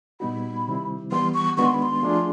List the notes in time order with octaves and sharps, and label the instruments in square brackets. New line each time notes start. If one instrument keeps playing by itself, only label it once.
[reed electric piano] A#2 G3 B3 D#4 F#4 [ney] B5
[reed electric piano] C3 D#3 G3 C4 E4
[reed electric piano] E3 G3 B3 [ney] C6
[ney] C#6
[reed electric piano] D#3 G#3 B3 D4 F#4 [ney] C#6
[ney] C6
B5
C6
[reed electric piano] F3 A3 D4 F4 G#4